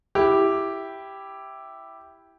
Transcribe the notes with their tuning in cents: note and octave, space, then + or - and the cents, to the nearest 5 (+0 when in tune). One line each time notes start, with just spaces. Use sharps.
E4 +0 G4 +0